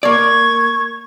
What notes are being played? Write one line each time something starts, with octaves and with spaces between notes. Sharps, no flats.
A#3 D5 C#6 G#6